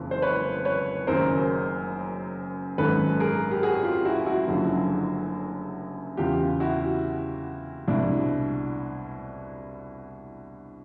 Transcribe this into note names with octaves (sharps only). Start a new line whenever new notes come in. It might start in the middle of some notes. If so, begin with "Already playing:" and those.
Already playing: F#1 F2 C#3 E3
C5
B4 C#5
B4 C#5
F#1 F#2 D#3 A#4 C5
G#1 F#2 D#3 A4 B4
G#4 A#4
G4
F#4 G#4
F4 G4
E4 F#4
E4 F#4
F#1 F#2 D3 F3
E2 C#3 E3 F4 G4
E4 F#4
C2 B2 D4 E4